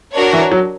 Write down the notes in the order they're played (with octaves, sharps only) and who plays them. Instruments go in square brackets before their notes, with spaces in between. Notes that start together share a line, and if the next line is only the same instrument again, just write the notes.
[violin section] D4 F#4 A#4 C#5
[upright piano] E3
F#3